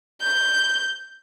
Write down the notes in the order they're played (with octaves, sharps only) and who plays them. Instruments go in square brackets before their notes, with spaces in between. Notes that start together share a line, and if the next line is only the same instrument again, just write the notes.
[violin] G6